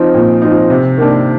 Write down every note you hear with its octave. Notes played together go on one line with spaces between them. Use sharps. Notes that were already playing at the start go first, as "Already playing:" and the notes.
Already playing: F3 C4 D#4
A#2
F3 C4 D#4
C3
D#3 A#3 D4